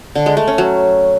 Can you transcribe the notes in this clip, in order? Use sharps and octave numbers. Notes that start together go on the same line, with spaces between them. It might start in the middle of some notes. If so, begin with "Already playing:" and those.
D3
G#3
A3
C#4
F#3